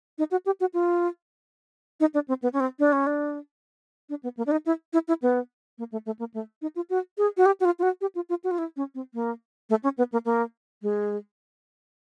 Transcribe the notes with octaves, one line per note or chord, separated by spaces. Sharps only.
D#4
F#4
G4
F#4
F4
D#4
D4
C4
B3
C#4
C4
D4
C#4
D4
D4
B3
A#3
D4
D#4
E4
E4
E4
B3
A#3
A3
A3
A#3
A3
D#4
F4
F#4
G#4
F#4
G4
F#4
F4
F4
F#4
G4
F4
F4
F#4
F4
E4
C#4
C4
A#3
A3
C#4
B3
A#3
A#3
G#3